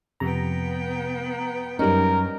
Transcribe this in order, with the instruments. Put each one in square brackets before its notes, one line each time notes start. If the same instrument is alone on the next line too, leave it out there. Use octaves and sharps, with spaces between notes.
[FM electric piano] F2 C3 A#5 [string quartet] B3 G5
[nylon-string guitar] F#2 C#4 [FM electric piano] G3 D#4 [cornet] A#4